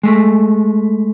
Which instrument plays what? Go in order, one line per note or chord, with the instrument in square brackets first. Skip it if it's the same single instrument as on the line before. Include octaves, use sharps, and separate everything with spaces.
[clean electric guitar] G#3 A3